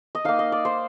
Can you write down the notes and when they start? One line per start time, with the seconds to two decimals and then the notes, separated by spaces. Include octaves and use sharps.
0.15 D#5
0.24 A#3 D#4 F5
0.39 D#5
0.52 D5
0.65 C5